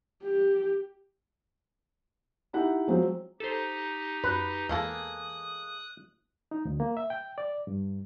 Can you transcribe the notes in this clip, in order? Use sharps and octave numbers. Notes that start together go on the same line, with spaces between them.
G4
D#4 E4 G4 F#5
F3 F#3 G#3 C4 F#4
D#4 G4 A4 C5
F#2 B4
E2 G#3 A#3 A4 D#6 F#6
D#4
D2
A#3
E5
G5
D5
G2